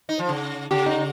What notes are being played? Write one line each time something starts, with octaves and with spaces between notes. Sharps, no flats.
D#4
F3
C#3
C#3 G4
D#4